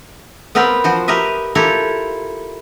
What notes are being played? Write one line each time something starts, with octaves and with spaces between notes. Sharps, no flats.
B3 C4 A#4 B4 F5 G5
F3 F#4 C5
G4 A#4 B4 D#5 E5
E4 F4 G4 A4 A#4 F5